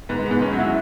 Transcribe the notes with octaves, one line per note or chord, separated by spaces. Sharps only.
G#2 B4
B3
G#2
C#4
F#3 F#4
E4